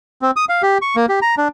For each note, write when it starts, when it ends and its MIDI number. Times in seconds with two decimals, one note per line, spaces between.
0.22 0.31 60
0.36 0.45 87
0.49 0.62 77
0.62 0.78 67
0.82 0.96 85
0.96 1.06 58
1.09 1.20 67
1.22 1.35 82
1.38 1.48 62